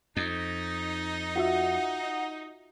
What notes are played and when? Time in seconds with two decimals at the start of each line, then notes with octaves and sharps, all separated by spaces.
0.17 F2 D#4
1.36 F4 F#4 E5 F#5